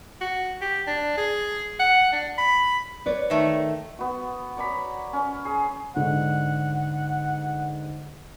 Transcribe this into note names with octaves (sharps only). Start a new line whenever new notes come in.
F#4
G4
D4
G#4
F#5
D4
B5
B4 C#5 D5
D#3 A3
B3 F#4
C#5 D5 A#5 B5
C#4
G#4
G#2 D3 F#5